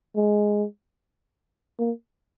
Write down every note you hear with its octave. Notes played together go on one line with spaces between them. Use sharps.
G#3
A#3